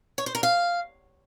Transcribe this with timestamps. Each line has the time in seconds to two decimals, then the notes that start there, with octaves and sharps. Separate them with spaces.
0.18 C#5
0.26 C5
0.35 A#4
0.43 F5